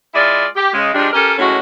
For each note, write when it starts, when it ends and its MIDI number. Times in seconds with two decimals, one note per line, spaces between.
0.15 0.46 56
0.15 0.46 64
0.15 0.46 65
0.15 0.46 74
0.56 0.72 67
0.74 0.91 49
0.74 0.91 56
0.94 1.09 53
0.94 1.09 55
0.94 1.09 56
0.94 1.09 62
1.13 1.34 61
1.13 1.34 67
1.13 1.34 69
1.13 1.34 70
1.38 1.60 45
1.38 1.60 54
1.38 1.60 56
1.38 1.60 61
1.38 1.60 66